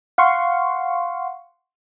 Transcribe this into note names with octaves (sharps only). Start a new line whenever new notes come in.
F5 F#5 C6 C#6